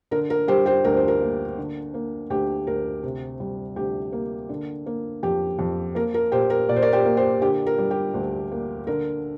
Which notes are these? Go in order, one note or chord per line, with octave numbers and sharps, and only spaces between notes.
D3 A#4
A#4
G3 G4 C5
G4 C5
D2 A#4
C5
A#4
A#3
D3
A#3
D2 G4
D2 A#4
C3
G3
D2 G4
A#3
D3
A#3
F2 G4
F2
A#3 A#4
A#4
A#2 G4 C5
A#4
A#2 D5
C5
A#4 D5
G4 C5
A#3
G4 C5
D3 G4
A#4
G3
G4
D2
A#3
D3 A#4